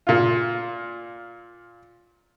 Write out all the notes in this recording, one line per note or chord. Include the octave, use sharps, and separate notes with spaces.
A#2 F4